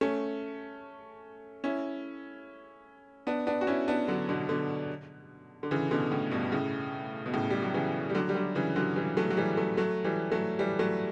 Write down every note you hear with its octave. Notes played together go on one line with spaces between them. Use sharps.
A3 C#4
C#4 E4
B3 D4
B3 D4
F#4
C#4 E4
B3 D4
D3 F#3
B2 D3
B2 D3
D3
C#3 E3
B2 D3
A2 C#3
G2 B2
A2 C#3
B2
A2 C#3
G3
F#3
C#3 E3
G3
D3 F#3
G3
D3 F#3
C#3 E3
D3 F#3
E3 G3
F#3 A3
F#3
E3 G3
F#3 A3
F#3 A3
E3 G3
F#3 A3
E3 G3
F#3 A3